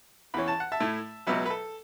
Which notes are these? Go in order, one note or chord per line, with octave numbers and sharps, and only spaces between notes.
E2 E3 C#4 B5
A5
F#5
E5 A5
A2 A3 E4
C#2 B2 F#3 B4 E5
B4
A4